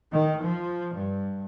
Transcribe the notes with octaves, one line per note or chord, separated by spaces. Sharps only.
D#3
F3
G2